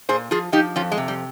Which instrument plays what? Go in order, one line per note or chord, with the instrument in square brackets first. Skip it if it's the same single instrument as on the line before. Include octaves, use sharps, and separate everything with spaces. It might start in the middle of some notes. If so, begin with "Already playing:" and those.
[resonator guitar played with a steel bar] A#2 G#4 C5
F3 F4 G#4
F3 D#4 G4
F2 C#4 F4
G#3
C3
G3